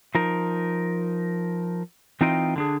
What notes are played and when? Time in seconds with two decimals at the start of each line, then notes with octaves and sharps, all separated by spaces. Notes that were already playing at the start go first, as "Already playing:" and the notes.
0.15 F3 D#4 A#4
2.21 E3 C4 D#4 F4 D#5 G5
2.56 D3 D4 G#4